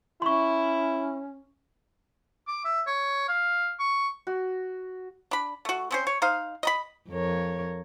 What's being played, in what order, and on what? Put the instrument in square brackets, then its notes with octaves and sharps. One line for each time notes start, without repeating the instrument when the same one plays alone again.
[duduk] C#4 [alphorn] E4 [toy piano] C6 C#6
[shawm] D6
E5
C#5
F5
C#6
[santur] F#4
[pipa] D4 B5
A3 F#4
C4 C#4 C5
C#5
D#4 C5 F5
D#5 A#5 B5
[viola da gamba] F2 A#4 C#5